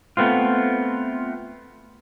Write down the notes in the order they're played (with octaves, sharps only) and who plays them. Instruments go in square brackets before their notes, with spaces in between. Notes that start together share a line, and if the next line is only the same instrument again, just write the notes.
[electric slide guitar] A3 B3 C4 F4